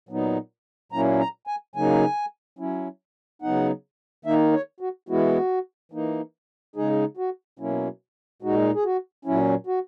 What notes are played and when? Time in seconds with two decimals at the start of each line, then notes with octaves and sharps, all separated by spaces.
0.09 A#2 F#3 B3 D#4
0.92 A#2 F#3 A#3 C#4 E4 A#5
1.20 A#5
1.47 G#5
1.75 C#3 F#3 A#3 D#4 G#5
2.59 F#3 C#4 E4
3.42 C#3 F#3 B3 D#4 F#5
4.25 D#3 A#3 D#4 E5
4.53 C#5
4.80 F#4
5.09 E3 G#3 B3 E4 F#4
5.92 E3 A#3 D#4
6.76 C#3 G#3 D#4 G#4
7.17 F#4
7.59 B2 F#3 A#3 C#4 E4
8.42 A#2 G#3 D#4 F#4
8.74 G#4
8.85 F#4
9.25 A#2 F#3 C#4 E4
9.67 F#4